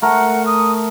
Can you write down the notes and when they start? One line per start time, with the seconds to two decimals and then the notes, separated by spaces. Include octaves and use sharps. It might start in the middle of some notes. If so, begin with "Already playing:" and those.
0.02 A3 A#4 F#5
0.46 D#6